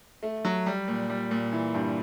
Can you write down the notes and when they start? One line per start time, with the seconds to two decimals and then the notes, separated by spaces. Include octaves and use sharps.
0.23 A3
0.45 F#3
0.66 G3
0.88 A#2
1.10 G3
1.31 A#2
1.52 E3
1.74 G2